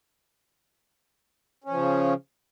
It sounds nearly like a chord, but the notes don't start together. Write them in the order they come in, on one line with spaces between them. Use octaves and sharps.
C#4 F3 C#3